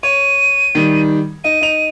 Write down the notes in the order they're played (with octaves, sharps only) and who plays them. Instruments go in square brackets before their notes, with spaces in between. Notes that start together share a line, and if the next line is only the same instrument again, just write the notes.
[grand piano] C#5 [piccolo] D#7
[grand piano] D#3 G3
[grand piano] D#4 [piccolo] D#7
[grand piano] D#4 F7